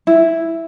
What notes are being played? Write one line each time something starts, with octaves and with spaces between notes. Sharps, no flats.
E4